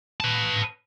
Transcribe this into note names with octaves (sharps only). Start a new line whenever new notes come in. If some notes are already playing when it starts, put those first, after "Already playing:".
B4 A5